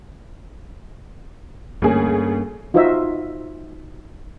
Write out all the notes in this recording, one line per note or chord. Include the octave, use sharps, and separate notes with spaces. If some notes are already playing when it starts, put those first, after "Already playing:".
D2 G2 A#3 C#4 G#4
D#4 F4 F#4 C5 D#5 E5